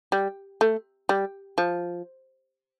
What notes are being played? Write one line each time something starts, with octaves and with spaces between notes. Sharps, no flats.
G3
A3
G3
F3